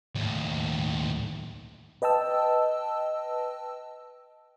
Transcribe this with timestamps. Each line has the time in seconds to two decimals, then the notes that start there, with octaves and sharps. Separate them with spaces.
0.15 D#2 A2
2.02 B4 D#5 G5 A5 E6